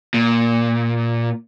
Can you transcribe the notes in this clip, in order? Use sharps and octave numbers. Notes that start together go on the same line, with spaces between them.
A#2